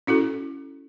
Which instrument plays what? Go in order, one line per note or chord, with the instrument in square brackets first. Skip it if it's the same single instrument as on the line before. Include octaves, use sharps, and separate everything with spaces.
[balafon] C#4 E4 F#4 A4